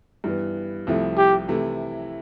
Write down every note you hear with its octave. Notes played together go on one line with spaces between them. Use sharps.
G2 E3 B3
C2 C3 F3 A3 E4
G4
C3 E3 A3 E4